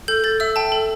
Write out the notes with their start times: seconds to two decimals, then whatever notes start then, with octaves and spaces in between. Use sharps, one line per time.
0.08 A4 G6
0.24 A4 A6
0.40 E5 E6
0.56 G5 A5
0.72 A4